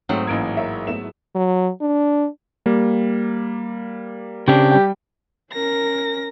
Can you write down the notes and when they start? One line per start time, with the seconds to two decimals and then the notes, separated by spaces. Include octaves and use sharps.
0.09 G#2 F#3 A3 C4
0.27 A1 A#3 G#6 D7
0.57 A#4 C#5 E5
0.87 A3 B3 E4 E7
1.35 F#3
1.81 D4
2.66 G3 A#3
4.48 C#3 C4 D4 G4
4.72 G3 G5
5.53 C#4 A#4 A#6